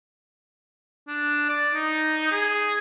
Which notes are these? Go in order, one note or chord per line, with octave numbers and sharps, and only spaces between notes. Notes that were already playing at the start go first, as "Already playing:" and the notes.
D4
D5
D#4
G#4